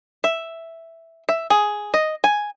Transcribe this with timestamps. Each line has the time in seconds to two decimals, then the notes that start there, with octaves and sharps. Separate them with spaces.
0.24 E5
1.29 E5
1.50 G#4
1.94 D#5
2.24 G#5